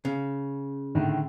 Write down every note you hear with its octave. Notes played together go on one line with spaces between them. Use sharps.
C#3
A2 D3 D#3